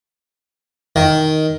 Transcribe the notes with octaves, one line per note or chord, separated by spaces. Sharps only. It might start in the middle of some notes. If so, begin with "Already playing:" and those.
D#3